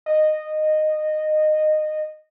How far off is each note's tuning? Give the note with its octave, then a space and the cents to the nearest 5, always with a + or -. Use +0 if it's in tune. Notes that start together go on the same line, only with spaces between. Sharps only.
D#5 -15